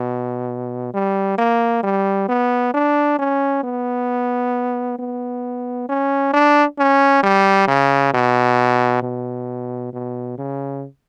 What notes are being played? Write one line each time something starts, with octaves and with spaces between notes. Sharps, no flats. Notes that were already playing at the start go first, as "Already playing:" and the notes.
Already playing: B2
G3
A#3
G3
B3
D4
C#4
B3
B3
C#4
D4
C#4
G3
C#3
B2
B2
B2
C#3